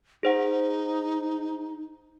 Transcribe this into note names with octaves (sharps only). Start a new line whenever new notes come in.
D#4 G#4 C5 F#5